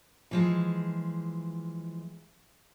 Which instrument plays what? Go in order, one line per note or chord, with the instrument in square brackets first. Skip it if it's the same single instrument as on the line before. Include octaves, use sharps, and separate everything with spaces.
[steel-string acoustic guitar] E3 F3 G#3